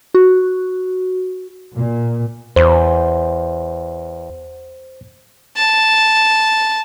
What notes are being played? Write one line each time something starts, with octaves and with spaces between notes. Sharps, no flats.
F#4
A#2
E2 C5
A5